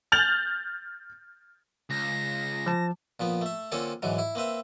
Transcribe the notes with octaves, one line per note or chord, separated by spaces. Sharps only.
F6 G6 A6 F7 F#7
C#2 A#6
F3 A5
A#2 F3 B3
A3 E5
D3 A#3 C4 C#4 F4 A4
G#2 D3 E3 F#3
E4
A#3 C4 B4 E5